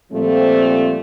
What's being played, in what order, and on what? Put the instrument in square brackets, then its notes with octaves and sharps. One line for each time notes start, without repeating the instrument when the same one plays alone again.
[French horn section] A#2 F3 G3 A3 C4